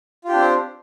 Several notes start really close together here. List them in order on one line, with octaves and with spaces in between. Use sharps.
F4 G4 D4 C4 C5